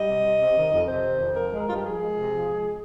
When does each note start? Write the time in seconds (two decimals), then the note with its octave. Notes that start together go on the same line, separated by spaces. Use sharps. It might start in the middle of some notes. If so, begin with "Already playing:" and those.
Already playing: G3 D#5
0.09 C3
0.25 C3
0.41 C3
0.56 D#3
0.72 F2
0.88 C3 C5
1.04 D#3
1.20 F2
1.36 F3 A#4
1.51 G#3
1.60 A#4
1.67 G2 F4
1.76 G4
1.83 F3 G#4
1.99 G#3
2.15 C3
2.31 F3
2.47 G#3